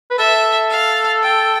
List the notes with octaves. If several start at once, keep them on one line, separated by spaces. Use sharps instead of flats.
B4
A4 E5
F5
G5